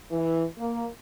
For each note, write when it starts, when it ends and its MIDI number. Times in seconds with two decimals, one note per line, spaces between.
0.12 0.45 52
0.58 0.85 58